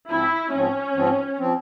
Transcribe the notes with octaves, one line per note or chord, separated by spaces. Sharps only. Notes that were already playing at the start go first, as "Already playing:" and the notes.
G#2 F3 C4 E4
G#2 F3 C4 C#4
G#2 F3 C4
F3 C4